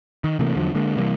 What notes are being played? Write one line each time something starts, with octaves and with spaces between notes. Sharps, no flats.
D#3
C3 E3 A3 A#3
E2 D3 F3 F#3
D3 G#3 A#3
C3 E3 G3 A#3